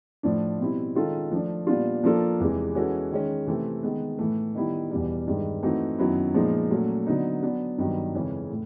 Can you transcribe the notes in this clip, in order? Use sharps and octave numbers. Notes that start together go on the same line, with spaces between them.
A2 F3 A3 D4
B2 G3 C4 E4
D#3 G#3 C#4 F4 A4
F3 A3 D4
A#2 G3 B3 D4 F4
F3 A#3 D4 F4 A4
E2 C3 E3 G#3
E3 G#3 C#4 F#4 A4
D#3 G#3 C#4
C3 E3 A3 C4
D#3 G#3 B3
A2 E3 A3
D#3 G3 B3 E4
E2 B2 G3
G2 D#3 G#3
E3 A3 C4 D#4 F#4
F#2 D#3 F#3 B3 E4
A#2 F3 G#3 B3 D#4
A#2 F#3 A3 C#4
D3 F#3 B3 D#4
F#3 B3 D4
G2 D#3 F#3 B3
F2 C#3 E3 G#3 C#4
A2